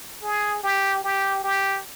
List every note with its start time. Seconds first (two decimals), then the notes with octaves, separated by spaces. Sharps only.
0.23 G#4
0.63 G4
1.04 G4
1.44 G4